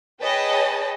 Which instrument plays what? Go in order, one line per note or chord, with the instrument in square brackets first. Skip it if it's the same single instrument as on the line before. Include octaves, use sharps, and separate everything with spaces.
[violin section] G#4 B4 C#5 D#5 G5 A5